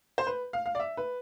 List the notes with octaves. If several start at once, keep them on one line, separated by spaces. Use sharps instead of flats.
C5
B4
F5
F5
D5
E5
B4